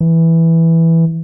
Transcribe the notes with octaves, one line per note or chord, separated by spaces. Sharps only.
E3